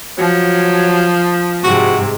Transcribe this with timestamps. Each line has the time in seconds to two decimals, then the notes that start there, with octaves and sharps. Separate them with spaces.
0.18 F3 F#3
1.64 G#2 C3 F#4